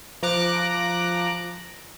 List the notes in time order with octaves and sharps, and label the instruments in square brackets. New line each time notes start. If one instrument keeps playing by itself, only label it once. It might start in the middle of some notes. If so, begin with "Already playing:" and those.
[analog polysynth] F3 A#5 D6 F#6